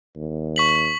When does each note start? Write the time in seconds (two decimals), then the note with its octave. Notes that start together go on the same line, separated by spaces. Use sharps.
0.16 D#2
0.56 C#6 B6 F#7